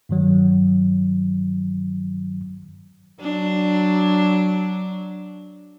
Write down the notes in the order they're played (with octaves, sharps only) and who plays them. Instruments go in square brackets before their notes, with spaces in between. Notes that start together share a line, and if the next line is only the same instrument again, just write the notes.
[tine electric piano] G2 D#3 F#3
[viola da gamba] F#3 D4